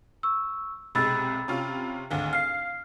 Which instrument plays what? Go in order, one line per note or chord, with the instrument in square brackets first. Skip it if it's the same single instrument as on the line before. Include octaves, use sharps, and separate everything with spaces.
[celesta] C#6 E6
[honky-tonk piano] B1 C3 G#3 [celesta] B5 E6 A6
[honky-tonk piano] C3 C#4 F4
[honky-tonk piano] G#1 D2 [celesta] F5
[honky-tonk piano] F5 [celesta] F6 C7